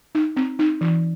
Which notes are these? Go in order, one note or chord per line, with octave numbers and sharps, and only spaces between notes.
D#4
C4
D#4
E3